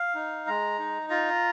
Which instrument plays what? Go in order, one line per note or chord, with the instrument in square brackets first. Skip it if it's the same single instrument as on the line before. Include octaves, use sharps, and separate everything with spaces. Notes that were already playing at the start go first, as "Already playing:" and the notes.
Already playing: [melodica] F5
D#4
G#3 A#5
D#4
F4 A#5